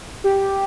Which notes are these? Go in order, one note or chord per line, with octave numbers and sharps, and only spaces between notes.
G4